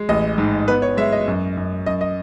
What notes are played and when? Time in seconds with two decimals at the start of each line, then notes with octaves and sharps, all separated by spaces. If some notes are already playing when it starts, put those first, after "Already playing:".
Already playing: G#3
0.09 A1 D#5
0.38 G#2
0.68 B3 B4
0.82 C#5
0.97 G#3 E5
1.12 D#5
1.28 F#2
1.57 F#2
1.86 F#2 D#5
2.01 D#5